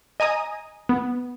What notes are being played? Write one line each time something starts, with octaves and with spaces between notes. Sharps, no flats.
D#5 G#5 A#5 D#6
B3